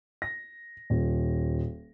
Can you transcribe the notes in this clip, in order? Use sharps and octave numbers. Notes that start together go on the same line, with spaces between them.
A#6
D#1